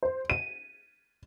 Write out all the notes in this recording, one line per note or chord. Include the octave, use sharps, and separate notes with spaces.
C5
D#7